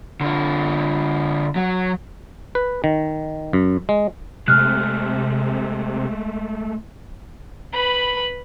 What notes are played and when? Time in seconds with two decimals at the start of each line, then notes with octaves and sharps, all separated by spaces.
0.21 D3 F4
1.56 F#3
2.55 B4
2.84 D#3
3.53 F#2
3.89 G#3
4.48 C3 G#3 A3 F6 F#6
7.74 B4 B5